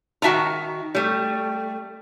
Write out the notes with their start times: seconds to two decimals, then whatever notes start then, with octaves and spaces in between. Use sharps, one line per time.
0.22 D#3 F#4 E5 A5 A#5
0.95 G3 A3